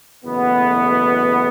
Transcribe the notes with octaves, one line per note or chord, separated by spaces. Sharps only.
F#1 E2 B2 A3 B3